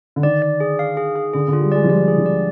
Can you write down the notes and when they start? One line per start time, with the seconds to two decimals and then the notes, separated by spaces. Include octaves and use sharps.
0.16 D3
0.23 D#3 D5
0.42 D5
0.60 G#4
0.79 F5
0.97 G#4
1.16 G#4
1.33 D3 G#4
1.48 D3
1.53 F4
1.61 G3
1.72 G#3 D5
1.84 F3
1.89 G3 D5
2.08 G#4
2.18 F3
2.26 D5